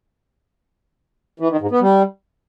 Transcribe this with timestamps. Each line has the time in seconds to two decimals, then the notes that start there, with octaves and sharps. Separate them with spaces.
1.40 E3
1.50 D#3
1.61 G#2
1.71 B3
1.81 G3